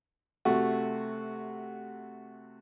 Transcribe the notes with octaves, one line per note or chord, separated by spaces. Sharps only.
C3 A3 F#4